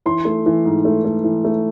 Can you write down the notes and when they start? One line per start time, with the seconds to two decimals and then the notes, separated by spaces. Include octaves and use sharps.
0.06 E3 C6
0.25 A3
0.46 E3
0.65 G#2
0.85 A3
1.05 A3
1.24 E3
1.45 A3